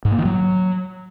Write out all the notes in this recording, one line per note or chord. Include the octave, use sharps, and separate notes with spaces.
G#2
A#3
D#3
F#3